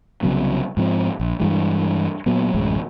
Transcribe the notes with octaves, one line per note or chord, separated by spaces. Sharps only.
C2 C#3 F#3 B3
G#2 F3 C4
A#1
G2 E3 G#3
A#2 F#3 B3
D1 A1 F#2 G#3